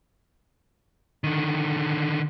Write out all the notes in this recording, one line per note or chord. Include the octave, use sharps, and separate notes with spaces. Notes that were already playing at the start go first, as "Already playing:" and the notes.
D3 D#3